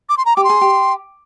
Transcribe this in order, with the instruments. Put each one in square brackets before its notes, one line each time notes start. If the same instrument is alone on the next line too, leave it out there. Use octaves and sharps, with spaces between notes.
[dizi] D6
C6
A#5
[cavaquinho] G4 [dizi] D6
[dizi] C6
[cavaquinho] G#4
G4